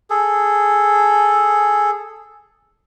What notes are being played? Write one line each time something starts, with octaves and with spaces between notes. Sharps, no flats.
G#4 A4